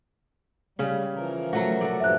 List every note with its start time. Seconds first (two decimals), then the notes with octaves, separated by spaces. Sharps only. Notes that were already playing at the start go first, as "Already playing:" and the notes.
0.79 C#3 G3 C#4
1.16 E3 F3 A#4
1.53 F#3 A3 F#4
1.81 F#4 A4 D5
2.00 G2 A#2 F3 E5 F#6